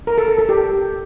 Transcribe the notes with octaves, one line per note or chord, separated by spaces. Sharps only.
A#4
A4
A4
A4
G4